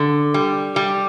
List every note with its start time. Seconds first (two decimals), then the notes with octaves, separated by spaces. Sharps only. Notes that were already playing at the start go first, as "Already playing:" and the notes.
Already playing: D3
0.34 G3
0.76 G3